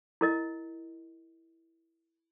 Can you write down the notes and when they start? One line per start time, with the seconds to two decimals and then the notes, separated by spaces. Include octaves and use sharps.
0.21 E4 A#4 D#5